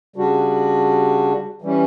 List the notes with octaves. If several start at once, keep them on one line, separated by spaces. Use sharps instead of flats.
C#3 G3 D4 F#4
E3 G3 C#4